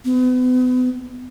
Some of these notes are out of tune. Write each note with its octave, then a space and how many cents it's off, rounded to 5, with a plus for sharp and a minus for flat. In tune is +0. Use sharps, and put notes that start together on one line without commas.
B3 +35